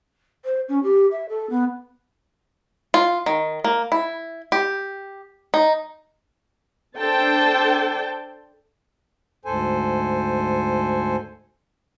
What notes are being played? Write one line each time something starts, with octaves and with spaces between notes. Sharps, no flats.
C5
C#4
G4
E5
A4
B3
F4
D#3
A#3
E4
G4
D#4
D4 A4 C5 G5 A5
D2 G#2 A4 C5 G#5